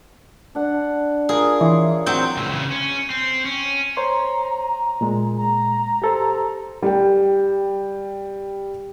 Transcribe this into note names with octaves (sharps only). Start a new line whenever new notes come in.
D4 F#5
F4 G#4 A#4
E3 C#5 C6
F#3 C4 G6
C#2 A#2
C#3 E3
C#4
C4
C#4
C5 C#5 A#5 C6
A#2 G#3
A#5
G4 A4 C5
G3 G5